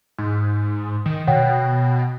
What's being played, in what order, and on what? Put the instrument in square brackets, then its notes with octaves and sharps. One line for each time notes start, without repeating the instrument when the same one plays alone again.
[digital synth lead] G#2
D#3
[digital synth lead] B2 [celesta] C#5 F#5 G5